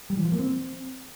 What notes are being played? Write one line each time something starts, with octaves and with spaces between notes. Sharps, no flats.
G3
E3
F3
A#3
C4